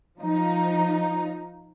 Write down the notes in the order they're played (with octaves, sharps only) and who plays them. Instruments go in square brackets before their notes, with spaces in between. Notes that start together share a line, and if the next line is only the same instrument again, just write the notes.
[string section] F3 D#4